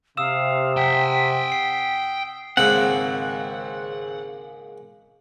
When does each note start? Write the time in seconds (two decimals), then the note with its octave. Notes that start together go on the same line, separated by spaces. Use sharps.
0.17 C3 F5 D#6 E6 E7
0.77 F#5 G5 B6
1.52 C7
2.57 G#1 G#2 C#3 A#3 C4 F#5